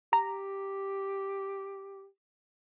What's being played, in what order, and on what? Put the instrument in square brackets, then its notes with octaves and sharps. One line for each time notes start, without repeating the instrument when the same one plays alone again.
[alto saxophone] G4 [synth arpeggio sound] A#5